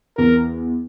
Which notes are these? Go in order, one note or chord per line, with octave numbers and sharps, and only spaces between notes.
E2 A#4